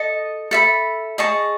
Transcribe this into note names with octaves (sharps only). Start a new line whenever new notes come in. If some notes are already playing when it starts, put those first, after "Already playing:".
Already playing: A4 D#5 A5
A4 E5 B5
G#4 D#5 A5 C#6